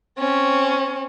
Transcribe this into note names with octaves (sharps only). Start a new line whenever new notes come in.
C4 C#4